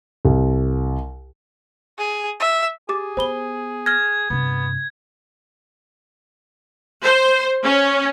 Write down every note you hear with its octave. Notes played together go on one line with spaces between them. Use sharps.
C2
G#4
E5
G4 G#4 D6 A6
B3 C5 B5 G7
F6 G#6 A#6
G2 C3 B3
C5
C#4